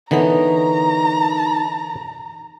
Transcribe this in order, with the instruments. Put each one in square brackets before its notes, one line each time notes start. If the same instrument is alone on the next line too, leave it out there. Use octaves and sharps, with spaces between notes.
[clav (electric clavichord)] D3 E3 B3 [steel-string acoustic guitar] D#4 A#4 C#5 [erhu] A#5